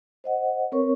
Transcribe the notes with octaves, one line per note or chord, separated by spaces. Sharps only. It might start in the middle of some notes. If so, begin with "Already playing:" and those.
C5 D#5 F#5
C4 A#4 B4 C#5 C#6